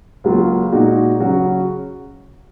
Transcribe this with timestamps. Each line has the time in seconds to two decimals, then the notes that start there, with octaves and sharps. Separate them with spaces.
0.24 C#2 C#3 F#3 A#3 F4
0.72 A#2 G#3 D#4 F#4
1.20 C#3 F#3 C#4 F#4